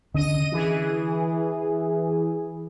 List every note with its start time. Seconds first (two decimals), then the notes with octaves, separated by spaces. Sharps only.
0.14 D3 C#4 D4 D#5 D#7
0.52 E3 G#4